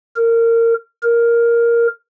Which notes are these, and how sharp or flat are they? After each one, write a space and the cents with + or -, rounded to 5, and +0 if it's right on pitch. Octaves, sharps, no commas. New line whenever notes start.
A#4 -20
A#4 +5